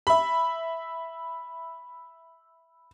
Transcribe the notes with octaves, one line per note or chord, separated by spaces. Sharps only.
E5 B5